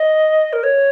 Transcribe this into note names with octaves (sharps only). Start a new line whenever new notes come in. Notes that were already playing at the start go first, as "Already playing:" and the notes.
Already playing: D#5
A#4
C#5